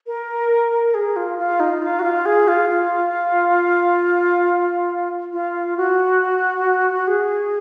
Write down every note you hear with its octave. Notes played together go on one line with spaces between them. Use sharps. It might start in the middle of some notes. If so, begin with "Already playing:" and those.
A#4
G#4
F4
F4
D#4
F4
F#4
F4
G#4
F4
F4
F4
F#4
G#4